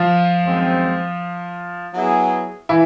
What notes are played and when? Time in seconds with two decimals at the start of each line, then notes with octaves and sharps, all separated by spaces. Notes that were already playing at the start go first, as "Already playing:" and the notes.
Already playing: F3 F4
0.42 F#2 D#3 G#3 C4
1.94 F#3 B3 E4 G#4
2.69 E3 E4